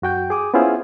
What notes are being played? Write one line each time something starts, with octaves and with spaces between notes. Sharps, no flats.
F#2 F#4 G5 G6
G#4 D6 D#6
B3 C#4 E4 F4 G#4 C5